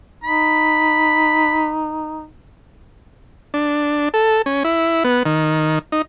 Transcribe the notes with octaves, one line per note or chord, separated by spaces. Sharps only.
D#4 B5
D4
A4
C#4
E4
B3
D#3
D#4